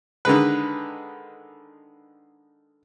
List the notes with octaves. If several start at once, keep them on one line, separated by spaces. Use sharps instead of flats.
D3 D#3 G#3 B4